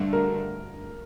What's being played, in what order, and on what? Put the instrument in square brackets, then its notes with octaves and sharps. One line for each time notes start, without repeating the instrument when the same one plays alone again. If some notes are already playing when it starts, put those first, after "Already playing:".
Already playing: [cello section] G2 D3 A3 D4
[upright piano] A#4